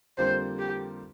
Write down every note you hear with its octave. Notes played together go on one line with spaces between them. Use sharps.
F2 D3 G3 A#3 F4 C5
G4